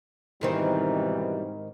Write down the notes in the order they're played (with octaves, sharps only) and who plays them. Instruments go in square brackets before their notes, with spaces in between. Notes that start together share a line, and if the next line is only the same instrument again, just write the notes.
[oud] G#2 D#3 C4 [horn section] B2 E3 G3